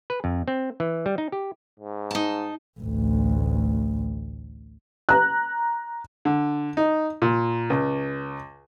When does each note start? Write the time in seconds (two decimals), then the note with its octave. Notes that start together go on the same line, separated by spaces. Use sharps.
0.10 B4
0.24 F2
0.48 C4
0.80 E3
1.06 G3
1.18 D#4
1.32 G4
1.79 G#2
2.11 D#4 A5
2.80 A1 D2
5.09 A#5 F#6
6.25 D3
6.77 D#4
7.22 A#2
7.70 C#2